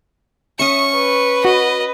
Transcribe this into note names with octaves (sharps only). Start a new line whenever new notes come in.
C#4 E5 C#6 D#6 C#7
B4
F#4 D#5